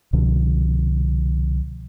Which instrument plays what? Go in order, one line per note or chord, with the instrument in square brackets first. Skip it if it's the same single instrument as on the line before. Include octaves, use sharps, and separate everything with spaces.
[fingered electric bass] C2 B2 D3 F3